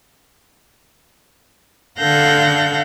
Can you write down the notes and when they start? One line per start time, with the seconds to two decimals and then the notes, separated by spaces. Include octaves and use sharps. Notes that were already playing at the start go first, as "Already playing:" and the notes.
1.99 D3 A4 F5 F#5 G6 A#6